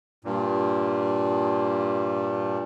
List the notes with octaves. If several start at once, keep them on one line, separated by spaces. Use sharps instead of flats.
G2 A#2